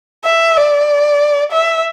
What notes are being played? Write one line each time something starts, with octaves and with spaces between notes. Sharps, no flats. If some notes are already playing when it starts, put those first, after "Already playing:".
E5
D5
E5